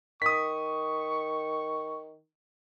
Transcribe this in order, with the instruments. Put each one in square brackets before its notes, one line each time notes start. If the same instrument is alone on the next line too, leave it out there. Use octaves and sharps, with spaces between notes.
[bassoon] D#3 [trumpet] C#6 [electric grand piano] D#6 B6